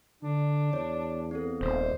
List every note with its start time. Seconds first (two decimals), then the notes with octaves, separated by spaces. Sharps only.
0.23 D3 D4
0.73 E2 C#5
1.31 B3 C4 A4
1.61 D#1 C5